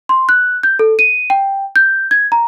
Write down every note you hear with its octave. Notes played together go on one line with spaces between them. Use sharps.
C6
F#6
G6
A4
D#7
G5
G6
G#6
A#5